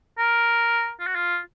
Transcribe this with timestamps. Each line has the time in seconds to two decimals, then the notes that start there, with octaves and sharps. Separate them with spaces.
0.18 A#4
1.00 F4
1.07 F#4
1.16 F4